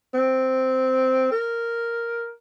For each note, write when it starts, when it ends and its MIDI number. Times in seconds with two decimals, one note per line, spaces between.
0.14 1.29 60
1.32 2.31 70